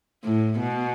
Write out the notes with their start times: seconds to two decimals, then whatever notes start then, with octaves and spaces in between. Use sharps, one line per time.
0.24 A2
0.59 B2